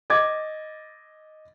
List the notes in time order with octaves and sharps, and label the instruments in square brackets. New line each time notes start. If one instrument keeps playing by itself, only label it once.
[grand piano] D#5 D6 G#6 A6